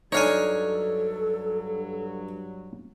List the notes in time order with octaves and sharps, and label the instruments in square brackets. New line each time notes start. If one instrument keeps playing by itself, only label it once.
[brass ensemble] G2 F#3 [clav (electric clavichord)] D4 D#4 [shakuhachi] A4 [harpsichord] C#5 F5 G#5